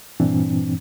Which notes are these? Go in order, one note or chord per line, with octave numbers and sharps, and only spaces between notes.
G2 A#2 E3 C4 D4